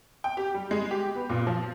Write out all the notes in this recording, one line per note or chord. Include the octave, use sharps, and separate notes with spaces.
G5
G4
G3
G#3
G4
B3
A#2
F3